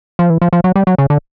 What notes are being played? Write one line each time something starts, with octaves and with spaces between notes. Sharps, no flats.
F3
E3
F3
F3
F#3
G3
F#3
C#3
D3